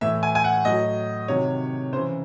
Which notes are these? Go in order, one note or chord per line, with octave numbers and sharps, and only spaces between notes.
A2 E3 E5
G#5
G#5
F#5
A2 F#3 D#5
C3 D#3 F#3 C#5
C#3 E3 C5